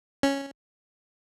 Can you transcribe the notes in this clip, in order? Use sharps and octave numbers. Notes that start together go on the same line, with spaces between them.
C#4